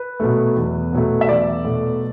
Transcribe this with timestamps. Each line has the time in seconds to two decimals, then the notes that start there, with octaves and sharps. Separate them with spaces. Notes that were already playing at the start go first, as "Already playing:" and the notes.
Already playing: B4
0.20 B2 F#3 A3
0.57 E2
0.93 B2 F#3 A3
1.21 E5
1.29 E2 D5
1.64 B2 F#3 A3